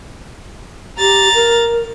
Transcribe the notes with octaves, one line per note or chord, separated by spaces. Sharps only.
G4 A#5 A6
A#4